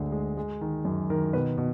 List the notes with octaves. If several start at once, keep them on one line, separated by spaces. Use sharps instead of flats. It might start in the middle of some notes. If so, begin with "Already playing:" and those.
Already playing: D2 D3 G#3
G#3
G#3
D#3
F#2
D#3 A#4
B2 B4
B2